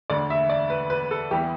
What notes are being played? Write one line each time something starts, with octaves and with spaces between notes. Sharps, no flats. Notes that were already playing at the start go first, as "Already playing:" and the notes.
E1 D2 D3 D5
E5
D5
B4
B4
A4
E2 E3 G3 B3 G4